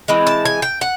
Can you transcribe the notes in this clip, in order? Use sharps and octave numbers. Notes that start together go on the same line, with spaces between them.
E3 G#3 C4
A5
G#5
G5
F#5